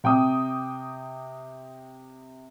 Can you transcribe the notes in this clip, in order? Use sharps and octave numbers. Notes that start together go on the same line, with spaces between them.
C3 G5 D6 D#6